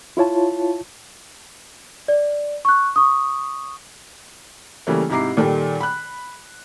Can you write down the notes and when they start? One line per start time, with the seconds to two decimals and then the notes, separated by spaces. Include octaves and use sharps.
0.17 E4 F4 C#5 A5
2.08 D5
2.65 C#6 F#6
2.96 C#6 D#6
4.87 C#3 E3 G3 A3 A#3
5.09 G#2 C3 E4 A#5 D6 C7
5.37 A#2 D#3 G3 A4
5.80 B5 F#6